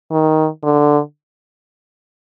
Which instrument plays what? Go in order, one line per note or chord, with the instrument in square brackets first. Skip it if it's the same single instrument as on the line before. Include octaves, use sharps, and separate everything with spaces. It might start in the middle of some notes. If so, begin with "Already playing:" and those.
[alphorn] D#3
D3